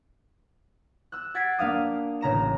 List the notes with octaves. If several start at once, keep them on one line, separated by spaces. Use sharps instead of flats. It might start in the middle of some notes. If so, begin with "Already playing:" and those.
E6 F#6
F#5 G#6 A6 B6 C7 D7
A#3 D4 F5 D#6
A1 C#3 A#5 E7